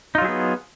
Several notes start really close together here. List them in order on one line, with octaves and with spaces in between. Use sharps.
D#4 F4 F#3 G#4 B3